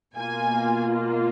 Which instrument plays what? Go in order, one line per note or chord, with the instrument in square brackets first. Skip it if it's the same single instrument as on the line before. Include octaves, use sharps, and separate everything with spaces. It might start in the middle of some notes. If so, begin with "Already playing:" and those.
[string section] B2 A#3 F4 G#5